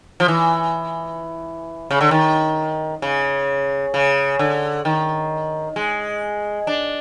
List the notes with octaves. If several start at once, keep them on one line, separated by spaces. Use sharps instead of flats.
F3
E3
C#3
D3
D#3
C#3
C#3
D3
D#3
G#3
D4